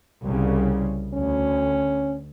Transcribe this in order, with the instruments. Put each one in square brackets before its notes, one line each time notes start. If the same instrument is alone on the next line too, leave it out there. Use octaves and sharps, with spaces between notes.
[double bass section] C2 C#3
[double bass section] D2 [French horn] C#4